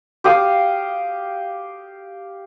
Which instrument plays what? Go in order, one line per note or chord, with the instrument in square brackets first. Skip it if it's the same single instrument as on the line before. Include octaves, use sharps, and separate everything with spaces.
[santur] G4 F5 D#6